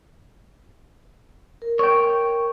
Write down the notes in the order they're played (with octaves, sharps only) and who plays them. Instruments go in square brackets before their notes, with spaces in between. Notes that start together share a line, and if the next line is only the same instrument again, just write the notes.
[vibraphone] A#4
[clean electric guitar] C#5 G5